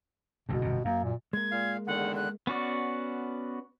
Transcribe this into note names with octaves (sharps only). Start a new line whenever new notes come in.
F#1 D2 G2 B2
G1 F2 C3
F#2 A#3
A#2
G#3 A#3 G#6
A#2 F5
E2 D3 D#3 F#5
F#6
B3 C#4 F#4 D5